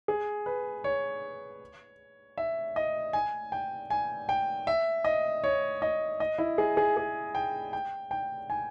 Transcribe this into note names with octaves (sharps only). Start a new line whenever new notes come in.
G#4
B4
C#5
E5
D#5
G#5
G5
G#5
G5
E5
D#5
C#5
D#5
D#5
E4
G#4
G#4
G#4
G5
G5
G5
G#5